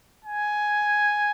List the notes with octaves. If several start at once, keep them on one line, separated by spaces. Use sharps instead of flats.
G#5